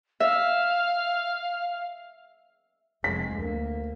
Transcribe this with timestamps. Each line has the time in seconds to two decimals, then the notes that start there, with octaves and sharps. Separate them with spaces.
0.20 E5 F5
3.04 F1 G#3 B6
3.36 D2 A#3